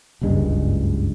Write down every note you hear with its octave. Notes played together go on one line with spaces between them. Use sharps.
F#1 C#2 G2 G#3